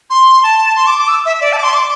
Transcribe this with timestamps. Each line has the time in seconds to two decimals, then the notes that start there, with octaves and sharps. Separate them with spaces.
0.10 C6
0.43 A5
0.76 C6
0.87 D6
0.98 D6
1.08 E6
1.26 E5
1.41 D5
1.53 A5
1.58 D6
1.63 C6
1.74 D6